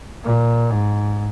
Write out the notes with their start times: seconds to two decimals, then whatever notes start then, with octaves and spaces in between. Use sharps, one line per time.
0.24 A#2
0.71 G#2